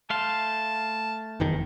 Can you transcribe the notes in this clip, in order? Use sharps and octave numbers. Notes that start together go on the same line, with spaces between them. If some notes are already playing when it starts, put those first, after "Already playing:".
A3 F5 A5 C6
F#1 E2 D#3